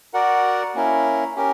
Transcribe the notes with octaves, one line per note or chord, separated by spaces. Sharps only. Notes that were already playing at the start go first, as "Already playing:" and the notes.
F#4 A#4 D5 F#5
A#3 C#4 E4 A#4
C#4 G4 A#4